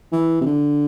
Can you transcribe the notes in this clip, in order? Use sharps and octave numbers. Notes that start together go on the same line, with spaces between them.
E3
C3
D3